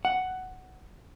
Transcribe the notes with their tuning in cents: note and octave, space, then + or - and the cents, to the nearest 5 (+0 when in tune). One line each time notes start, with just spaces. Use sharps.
F#5 +10